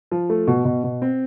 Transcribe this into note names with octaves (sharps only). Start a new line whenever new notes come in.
F3
A3
B2
B2
B2
C4